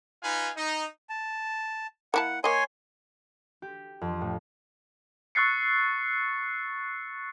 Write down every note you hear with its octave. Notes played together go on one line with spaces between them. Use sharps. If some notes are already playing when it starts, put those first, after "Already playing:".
D#4 F4 B4 F5 G#5
D#4
A5
A#3 E4 F#5 A5
A#3 C#5 D#5 G#5 C6
G4
F2
A2
C#6 E6 F#6 A6 C7 C#7